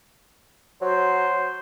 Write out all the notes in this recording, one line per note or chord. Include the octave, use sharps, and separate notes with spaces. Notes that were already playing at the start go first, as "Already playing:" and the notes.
F#3 C5